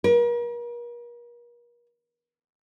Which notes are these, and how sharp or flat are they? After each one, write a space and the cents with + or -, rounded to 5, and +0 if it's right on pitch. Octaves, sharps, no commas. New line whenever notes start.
A#4 +40